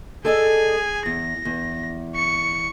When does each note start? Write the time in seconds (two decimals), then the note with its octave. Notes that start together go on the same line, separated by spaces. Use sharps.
0.25 G#4 A4 D5 D#5 G#5
1.06 E2 A#6
1.45 E2
2.15 C#6 C#7